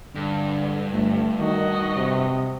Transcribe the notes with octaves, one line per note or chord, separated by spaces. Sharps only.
G2 D3
G1 A3
D#3 F#4 D#5
C3